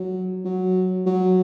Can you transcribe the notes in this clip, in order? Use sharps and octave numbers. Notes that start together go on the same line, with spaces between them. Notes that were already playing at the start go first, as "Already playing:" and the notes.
Already playing: F#3
F#3
F#3